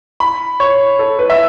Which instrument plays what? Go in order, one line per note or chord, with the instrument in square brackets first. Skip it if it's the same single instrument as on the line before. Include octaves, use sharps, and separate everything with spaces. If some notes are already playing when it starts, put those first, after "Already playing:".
[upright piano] B5
C#5
A4
B4
E5